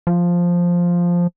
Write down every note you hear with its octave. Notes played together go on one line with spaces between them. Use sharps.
F3